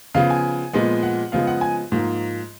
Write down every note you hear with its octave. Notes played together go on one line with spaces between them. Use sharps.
C#3 F3 B3 F5
G#5
A#2 F3 G#3 B3
F#5
C#3 F3 G#3 B3 F5
F#5
G#5
G#2 F3 A#3